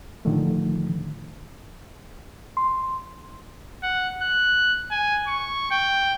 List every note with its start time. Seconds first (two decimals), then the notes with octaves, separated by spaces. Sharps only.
0.25 A2 D3 D#3 F3 A3
2.57 C6
3.83 F#5
4.22 F#6
4.91 G#5
5.27 C#6
5.71 G5